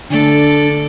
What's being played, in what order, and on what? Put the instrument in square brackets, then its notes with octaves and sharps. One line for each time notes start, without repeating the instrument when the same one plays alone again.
[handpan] D3 A3 [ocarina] D4 [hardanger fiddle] A4 D5